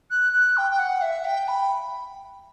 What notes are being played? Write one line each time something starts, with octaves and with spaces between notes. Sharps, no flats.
F#6
F#6
G5
G5
F#5
E5
G5
B5